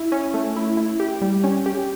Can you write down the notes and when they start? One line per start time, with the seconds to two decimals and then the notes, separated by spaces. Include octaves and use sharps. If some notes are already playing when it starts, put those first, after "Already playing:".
Already playing: E4
0.12 C#4
0.34 A3
0.56 E4
0.77 E4
1.00 G4
1.22 G3
1.44 C#4
1.66 G4